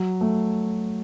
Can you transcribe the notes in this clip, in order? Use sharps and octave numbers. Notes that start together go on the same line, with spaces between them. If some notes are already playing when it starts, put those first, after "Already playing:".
Already playing: F#3
A3